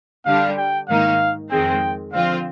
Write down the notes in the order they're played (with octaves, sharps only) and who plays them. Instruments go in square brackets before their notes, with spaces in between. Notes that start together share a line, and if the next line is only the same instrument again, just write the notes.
[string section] D3 G3 D4 [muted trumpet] F5
[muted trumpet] G5
[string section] G#2 D#3 A#3 D#4 [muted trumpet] F5
[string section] F2 D#3 G#3 C4 [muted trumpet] G5
[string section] D3 F3 C4 F4 [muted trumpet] F5